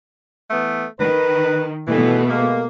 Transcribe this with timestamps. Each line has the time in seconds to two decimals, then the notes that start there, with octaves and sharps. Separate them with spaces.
0.51 E3 A3 B3
0.99 D#3 B4
1.87 G2 B2 E3 A3 B3
2.28 G#3 A#3